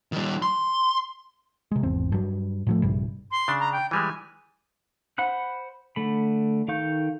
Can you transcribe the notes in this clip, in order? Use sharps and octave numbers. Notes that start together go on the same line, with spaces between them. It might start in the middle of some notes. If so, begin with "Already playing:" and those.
D#3 G3
C6
C3 G#3
G#1 E2 C4
G2 F#3
A2 F3 A3
A#1 G2 C3 G3
C6
C#3 D4
A#5
G5
E3 G3 G#3 G#5
C5 F#5 B5 F#6
D3 A3 B5
D#3 A4 F5 C#6 G6